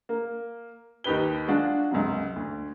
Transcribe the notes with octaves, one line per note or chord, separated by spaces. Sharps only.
A#3
D#2 D#4 G4 B4 G7
G#3 D4 F4 F#4 G#4
C#2 F#2 C3 F#3
D2